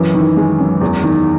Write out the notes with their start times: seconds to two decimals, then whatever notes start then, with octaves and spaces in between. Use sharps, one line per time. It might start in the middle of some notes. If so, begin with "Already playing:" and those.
Already playing: F#2 E3
0.14 D#3
0.37 G#3
0.60 F#2
0.81 E2
1.04 D#3